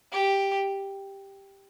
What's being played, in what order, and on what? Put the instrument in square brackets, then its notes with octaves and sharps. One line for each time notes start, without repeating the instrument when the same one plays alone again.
[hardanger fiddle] G4